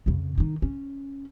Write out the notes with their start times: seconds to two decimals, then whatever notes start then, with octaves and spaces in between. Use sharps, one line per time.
0.06 F2 C#3
0.38 D#3 D#4
0.62 C#4